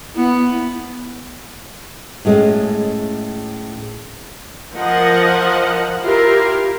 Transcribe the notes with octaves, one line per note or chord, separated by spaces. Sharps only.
B3 E4
A2 G#3 C#4
F3 A#4 D#5 F#5
E4 F4 G4 A#4